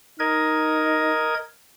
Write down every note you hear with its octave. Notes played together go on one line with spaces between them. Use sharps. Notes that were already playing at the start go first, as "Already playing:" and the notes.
D#4 A#4 D#5 G#6